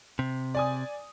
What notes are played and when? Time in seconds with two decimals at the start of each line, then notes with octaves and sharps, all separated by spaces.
0.19 C3
0.55 D5 G#5 D#6